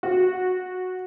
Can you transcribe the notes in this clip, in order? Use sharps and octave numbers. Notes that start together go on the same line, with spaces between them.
F#4